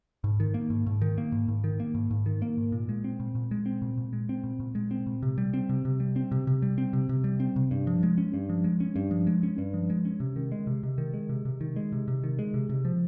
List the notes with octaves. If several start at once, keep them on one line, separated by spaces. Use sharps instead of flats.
G#2
D#3
A#3
G#2
G#2
D#3
A#3
G#2
G#2
D#3
A#3
G#2
G#2
D#3
A#3
G#2
A#2
G#3
C4
A#2
A#2
G#3
C4
A#2
A#2
G#3
C4
A#2
A#2
G#3
C4
A#2
C3
G3
C4
C3
C3
G3
C4
C3
C3
G3
C4
C3
C3
G3
C4
C3
G2
F3
G#3
C#4
G2
F3
G#3
C#4
G2
F3
G#3
C#4
G2
F3
G#3
C#4
C3
D#3
G#3
C3
C3
D#3
G#3
C3
C3
D#3
G#3
C3
C3
D#3
G#3
C3
C3
F3